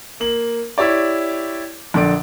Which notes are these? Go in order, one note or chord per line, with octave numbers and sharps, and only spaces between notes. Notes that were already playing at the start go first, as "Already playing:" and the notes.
A#3 F#7
E4 G4 C#5 D5
A#1 D3 D5 D7